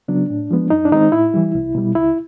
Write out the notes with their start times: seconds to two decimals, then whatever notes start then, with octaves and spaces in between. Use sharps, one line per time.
0.08 C#3 F#3 B3 D4
0.30 A2
0.51 F3 G#3 B3
0.70 F#2 D#4
0.85 D4
0.91 D#3 G#3 C4 D#4
1.12 A2 E4
1.34 E3 G3
1.55 C2
1.75 B2 G3
1.95 C#2 E4